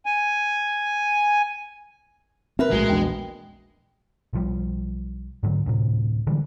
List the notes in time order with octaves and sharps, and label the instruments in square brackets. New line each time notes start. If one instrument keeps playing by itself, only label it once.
[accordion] G#5
[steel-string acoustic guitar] F#2 A#4 B4 [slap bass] C4 [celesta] E5
[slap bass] A#1 A2 A3 [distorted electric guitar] G#3 [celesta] F#4 G7
[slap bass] A#1 E2 [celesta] D4 F#4 G5
[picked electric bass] B1 F3 G3
G#2 D3 F#3
D2 A2 C3
D3 E3 G3 G#3